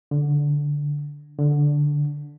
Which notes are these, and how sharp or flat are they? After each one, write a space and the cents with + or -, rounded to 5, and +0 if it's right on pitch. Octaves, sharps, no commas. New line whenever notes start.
D3 -10
D3 -5